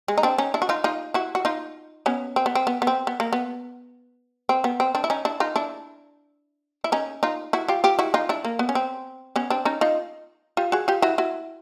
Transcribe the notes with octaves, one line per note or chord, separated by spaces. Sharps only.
G#3
D#4
C4 D4
C#4 D#4
D4 E4
F#4
D#4 F4
D#4 F4
E4 F#4
F#4
D#4 F4
B3 C#4
C4
B3
C4
B3
B3
C4
B3
A#3
B3
C4
B3
C4
C4 D4
E4
C#4 D#4
D4 E4
D#4 F4
D4 E4
E4
C#4 D#4
D#4 F4
E4 F#4
F4 G4
F4 G4
E4 F#4
D#4 F4
D4 E4
A#3
B3
C#4
C4
B3 C#4
C4 D4
C#4 D#4
D#4 F4
F4 G4
F#4 G#4
F4 G4
E4 F#4
E4 F#4